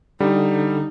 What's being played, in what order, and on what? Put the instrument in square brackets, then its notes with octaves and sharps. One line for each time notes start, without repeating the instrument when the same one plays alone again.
[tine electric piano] D3 [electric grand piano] G3 [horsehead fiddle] D#4